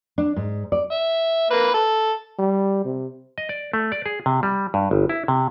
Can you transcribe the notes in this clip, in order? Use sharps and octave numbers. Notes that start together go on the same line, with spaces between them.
D4
G#2
D5
E5
A#3 B4
A4
G3
C3
D#5
D5
A3
D5
G#4
C3
G3
G2
G1
E4
C3